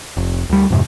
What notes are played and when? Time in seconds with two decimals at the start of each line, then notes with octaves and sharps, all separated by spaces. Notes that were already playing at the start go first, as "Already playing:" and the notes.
0.17 F1
0.49 D2 G3
0.70 F2 G#2 C3